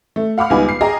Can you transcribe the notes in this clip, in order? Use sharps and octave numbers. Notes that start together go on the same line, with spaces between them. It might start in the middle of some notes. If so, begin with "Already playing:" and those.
A3
F5 F#5 B5 D6 F6
C#2 D#3 G3 B3 G#5 B5
C7
G#4 D#5 G5 G#5 A#5